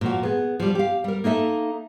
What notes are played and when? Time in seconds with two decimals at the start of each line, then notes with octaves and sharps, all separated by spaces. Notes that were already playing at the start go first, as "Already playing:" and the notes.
0.01 A#2 F3 F#4
0.23 B3 G#4
0.60 F3 G3
0.75 G4 F5
1.04 G3 A#4
1.24 A#3 D#4 A4 E5